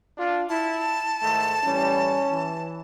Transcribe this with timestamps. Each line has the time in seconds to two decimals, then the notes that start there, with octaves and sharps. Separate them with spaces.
0.18 D4 F4
0.49 E4 A5
1.23 G#2 D#3 A3
1.65 A2 E3 G3 C#4
2.30 E3